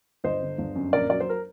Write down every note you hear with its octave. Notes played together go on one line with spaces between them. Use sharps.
G1 C5 D#5
D3
G1
F#2
A#1 A#4 D5
F#3 D5
C5
A#4